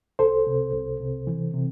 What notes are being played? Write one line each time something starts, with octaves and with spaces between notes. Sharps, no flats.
C2 A4 C5
C3
C2
C3
E3
C3